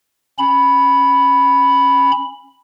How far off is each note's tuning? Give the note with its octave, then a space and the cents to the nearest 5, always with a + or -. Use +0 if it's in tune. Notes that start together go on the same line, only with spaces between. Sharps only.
C#4 -25 B5 +0